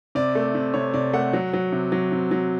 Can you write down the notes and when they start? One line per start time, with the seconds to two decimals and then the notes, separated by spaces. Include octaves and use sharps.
0.15 C3 D5
0.35 A3
0.55 C3
0.74 C3 C#5
0.94 C3 D5
1.13 A3 F#5
1.33 F#3
1.54 F#3
1.72 C3
1.92 F#3
2.12 C3
2.31 F#3